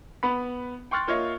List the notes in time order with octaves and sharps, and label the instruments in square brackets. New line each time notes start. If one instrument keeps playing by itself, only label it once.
[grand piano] B3 B5
G5 C6 C#6 F6 F#6 A6
A#3 F4 C#5 D#5 E5